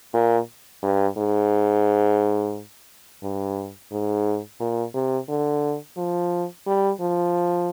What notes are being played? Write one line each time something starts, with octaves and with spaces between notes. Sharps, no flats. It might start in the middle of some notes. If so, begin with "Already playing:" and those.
A#2
G2
G#2
G2
G#2
A#2
C3
D3
F3
G3
F3